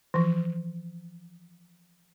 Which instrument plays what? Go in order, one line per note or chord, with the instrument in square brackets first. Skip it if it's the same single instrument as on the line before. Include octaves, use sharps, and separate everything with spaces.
[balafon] E3 F3